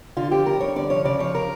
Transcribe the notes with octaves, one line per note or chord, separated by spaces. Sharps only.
D3 F4
F3 G4
G2 A#4
G2 C#5
D3 D5
F3 C#5
C#3 D5
F3 C#5
A#4